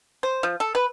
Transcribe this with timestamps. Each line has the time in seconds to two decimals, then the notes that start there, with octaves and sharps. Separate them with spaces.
0.23 C5
0.43 F3
0.60 A4
0.75 B4